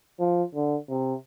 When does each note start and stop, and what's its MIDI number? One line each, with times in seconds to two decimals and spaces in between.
0.19 0.43 53
0.55 0.77 50
0.89 1.15 48